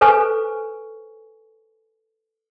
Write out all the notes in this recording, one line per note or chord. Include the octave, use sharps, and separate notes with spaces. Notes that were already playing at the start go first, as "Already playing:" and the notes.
A4 B4 C5 G#5 C#6